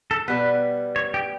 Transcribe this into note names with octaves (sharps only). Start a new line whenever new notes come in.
A4
B2 G3 B3 B4
C#5
G4